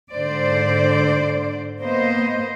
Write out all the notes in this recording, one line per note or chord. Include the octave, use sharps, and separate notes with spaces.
G#2 D3 C5 D5
A#3 B3 C5 D#5